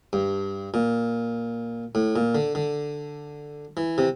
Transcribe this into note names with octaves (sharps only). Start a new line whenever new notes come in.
G2
A#2
A2
A#2
D3
D3
E3
C3